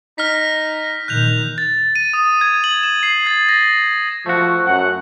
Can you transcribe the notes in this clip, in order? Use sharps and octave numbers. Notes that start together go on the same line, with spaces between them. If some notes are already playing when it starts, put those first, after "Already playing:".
D#4 F6 A#6 B6
A#2 D#3 F#6 G6 F7
A6
D#7
D#6
G#6
F#7
E7
C7
A6
A#6
F3 A3 F#4
F#2 F#5